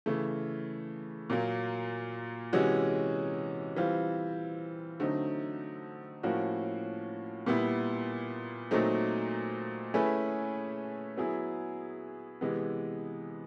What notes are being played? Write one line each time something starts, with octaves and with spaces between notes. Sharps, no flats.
C#3 E3 A3
A#2 F#3 A#3
C3 E3 G#3 C#4 F#4
E3 G3 C4 F4
D3 F#3 A3 C4 D#4
A2 F3 A#3 C#4 F#4
A#2 G3 B3 E4
A#2 F#3 A3 C4 D#4
A3 C#4 E4 G#4 B4
F#3 B3 E4 G#4
C3 E3 G#3 B3